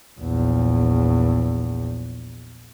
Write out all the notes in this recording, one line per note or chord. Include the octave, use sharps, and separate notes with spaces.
A#1 E2